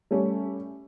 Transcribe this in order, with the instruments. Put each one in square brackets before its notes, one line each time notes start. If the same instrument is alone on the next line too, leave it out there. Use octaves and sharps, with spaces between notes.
[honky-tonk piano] G3 A3 C#4